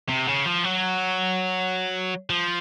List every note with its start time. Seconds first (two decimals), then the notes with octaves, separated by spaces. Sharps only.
0.09 C3
0.28 C#3
0.46 F3
0.64 F#3
2.30 F3